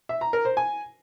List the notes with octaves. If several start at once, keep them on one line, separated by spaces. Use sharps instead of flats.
E5
A#5
A#4
C5
G#5